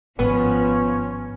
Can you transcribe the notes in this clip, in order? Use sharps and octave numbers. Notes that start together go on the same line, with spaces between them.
G#1 F3 B3 C#4